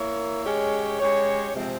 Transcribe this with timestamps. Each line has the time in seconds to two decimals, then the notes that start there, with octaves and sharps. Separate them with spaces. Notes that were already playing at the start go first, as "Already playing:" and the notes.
Already playing: A#3 E4 A#4 C#5
0.44 G#3 C#4 G4 C#5
0.99 G#3 C#4 G4 C#5
1.54 C3 F3 G#3 C4